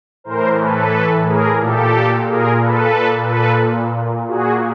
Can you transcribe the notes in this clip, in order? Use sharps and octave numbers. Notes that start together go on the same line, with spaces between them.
A2 E3 A#4 C5
A4 B4
G#4 A#4
A#2 G4 A4
G#4 A#4
A4 B4
A#2
A4 B4
A#2 F#4 G#4